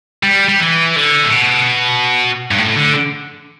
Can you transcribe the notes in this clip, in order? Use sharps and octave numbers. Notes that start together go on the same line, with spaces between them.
G3
G3
E3
D3
A2
B2
G2
A2
D3